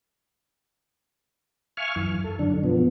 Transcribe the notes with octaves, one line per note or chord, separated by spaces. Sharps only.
E5 F5 G#5 C#6 F6
F#2 E3
A4
F#2 D3 D4
B2 F3 B3